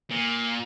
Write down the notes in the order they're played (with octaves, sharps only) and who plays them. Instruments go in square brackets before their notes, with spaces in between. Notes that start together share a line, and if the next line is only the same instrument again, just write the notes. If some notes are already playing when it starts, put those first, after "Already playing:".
[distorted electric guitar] A#2